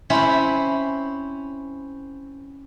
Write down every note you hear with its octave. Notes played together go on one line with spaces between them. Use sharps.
C4 C#4 E4 C5 E5 B5